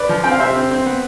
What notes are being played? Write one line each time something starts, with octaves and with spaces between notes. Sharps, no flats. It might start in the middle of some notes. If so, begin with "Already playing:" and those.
Already playing: B4 D5
F3
C4 G5
F5
C3 C5 E5
C4
C4
B3